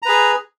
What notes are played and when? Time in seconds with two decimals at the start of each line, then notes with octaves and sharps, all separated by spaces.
0.02 A#5
0.06 B4
0.09 G#4